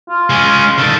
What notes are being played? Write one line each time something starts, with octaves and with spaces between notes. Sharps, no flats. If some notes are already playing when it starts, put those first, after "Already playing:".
F4
G#3 C#4
D#3 A4